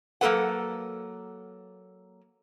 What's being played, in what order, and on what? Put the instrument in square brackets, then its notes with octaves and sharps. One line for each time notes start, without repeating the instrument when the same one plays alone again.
[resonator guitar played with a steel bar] F#3 A#3 C4 A4 B4 F#5